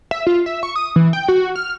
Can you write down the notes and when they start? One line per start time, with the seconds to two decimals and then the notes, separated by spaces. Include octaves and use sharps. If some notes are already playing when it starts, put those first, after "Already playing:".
0.11 E5
0.27 F4
0.46 E5
0.63 C#6
0.76 D#6
0.96 E3
1.13 G5
1.28 F#4
1.56 F6